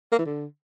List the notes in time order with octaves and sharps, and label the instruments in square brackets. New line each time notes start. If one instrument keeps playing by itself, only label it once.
[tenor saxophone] A#3
E3
D3